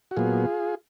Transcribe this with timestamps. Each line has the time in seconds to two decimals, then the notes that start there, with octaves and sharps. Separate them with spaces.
0.11 F#4
0.16 A#2 F#3 B3 F4 G#4